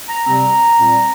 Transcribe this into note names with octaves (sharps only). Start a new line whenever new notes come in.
A#5
C3 G3 C4 A#5
A#2 G3 C4